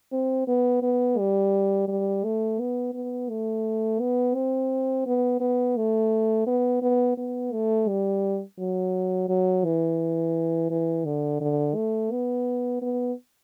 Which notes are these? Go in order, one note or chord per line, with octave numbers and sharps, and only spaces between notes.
C4
B3
B3
G3
G3
A3
B3
B3
A3
B3
C4
B3
B3
A3
B3
B3
B3
A3
G3
F#3
F#3
E3
E3
D3
D3
A3
B3
B3